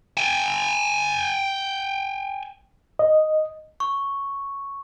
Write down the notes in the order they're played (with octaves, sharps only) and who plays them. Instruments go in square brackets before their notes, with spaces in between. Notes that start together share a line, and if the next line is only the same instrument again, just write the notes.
[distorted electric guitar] G5 G#5
[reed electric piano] D#5
[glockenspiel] C#6